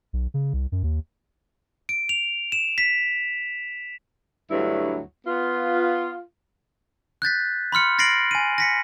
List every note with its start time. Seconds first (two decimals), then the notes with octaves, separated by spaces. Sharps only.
0.13 B1
0.34 C#3
0.53 C2
0.72 F#2
0.83 D#2
1.89 D7
2.09 F7
2.52 E7
2.78 B6
4.50 D2 G2 F#3 E4
5.27 B3 F4
7.22 F#6 G6 A6 B6
7.72 B5 C6 F6 C#7
7.99 A6 A#6 C7 D7 F#7
8.31 G#5 D#7
8.58 A#6 B6 C#7